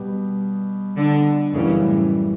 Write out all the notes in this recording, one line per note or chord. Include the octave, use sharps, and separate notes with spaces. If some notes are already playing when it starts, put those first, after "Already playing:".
Already playing: B2 G3 B3 G4
D3
F#2 C#3 E3 G3
A2